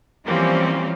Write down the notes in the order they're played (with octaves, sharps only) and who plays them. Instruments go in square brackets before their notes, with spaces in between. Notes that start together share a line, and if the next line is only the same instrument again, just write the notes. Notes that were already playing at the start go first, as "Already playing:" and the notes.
[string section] E3 F3 G3 A#3 C4 C#4